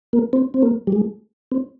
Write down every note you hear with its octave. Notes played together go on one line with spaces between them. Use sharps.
A#3
C4
C4
A#3
G3
G#3
C4